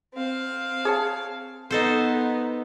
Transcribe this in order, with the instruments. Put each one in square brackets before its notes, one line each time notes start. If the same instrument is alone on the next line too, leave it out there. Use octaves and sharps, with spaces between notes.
[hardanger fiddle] C4 F5
[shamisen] G#4 C#5 A5
[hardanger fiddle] B3 [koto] D#4 A4 C5